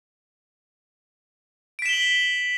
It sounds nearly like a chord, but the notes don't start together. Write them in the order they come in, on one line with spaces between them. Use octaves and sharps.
D7 B6 E7 G7 F#7